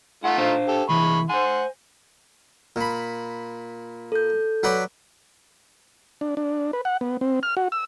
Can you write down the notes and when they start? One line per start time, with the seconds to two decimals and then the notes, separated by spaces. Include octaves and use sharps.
0.24 A3 D#4 F4 F#5
0.38 D4 C5 F5
0.68 G4 A4
0.89 C2 E3 G#3 B5 C#6
1.30 C5 F#5 G#5 C6
2.76 A#2 B5
4.12 A4 G6
4.63 F#3 B4 D5
6.21 D4
6.37 D4
6.73 B4
6.85 F#5
7.01 B3
7.21 C4
7.43 F6
7.57 F#4
7.72 E6